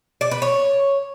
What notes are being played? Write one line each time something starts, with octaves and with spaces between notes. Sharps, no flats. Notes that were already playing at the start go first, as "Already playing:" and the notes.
D5
B4
C#5